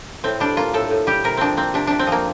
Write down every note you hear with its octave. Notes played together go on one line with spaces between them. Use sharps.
A2 C4
G3 D4
A#3 F4
A2 A4
A2
G3 G4
C3 A#4
F3 C4 D4
A#3 C4
C3 D4
C3 D4
C4
F3 A#3